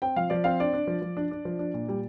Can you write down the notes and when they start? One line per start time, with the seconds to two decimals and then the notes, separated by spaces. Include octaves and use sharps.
0.02 C4 G5
0.16 F3 F5
0.30 F3 D5
0.44 C4 F5
0.60 D4 D5
0.73 D4
0.87 F3
1.02 F3
1.17 D4
1.31 D4
1.45 F3
1.59 D4
1.74 A#2
1.88 G3